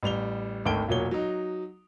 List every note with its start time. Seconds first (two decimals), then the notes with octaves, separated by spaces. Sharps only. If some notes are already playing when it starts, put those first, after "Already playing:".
0.03 A1 G3 F7 G7
0.66 G#1 D2 A4 G5 D7 G7
0.89 E1 A#2 F#3 C#5 G7
1.11 F#3 D#4